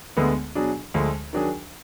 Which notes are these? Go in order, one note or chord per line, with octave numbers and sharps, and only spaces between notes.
D2 D3 G#3 B3
B2 F#3 D4 G#4
D2 D3 F3 G#3
D#3 F#3 D4 G#4